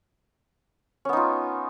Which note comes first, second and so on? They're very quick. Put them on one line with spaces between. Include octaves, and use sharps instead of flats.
C#4 B3 D#4 F4